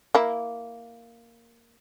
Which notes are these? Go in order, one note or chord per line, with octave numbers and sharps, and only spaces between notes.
A#3 E4